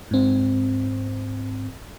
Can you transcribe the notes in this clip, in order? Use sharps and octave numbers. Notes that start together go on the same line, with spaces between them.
G#2 C4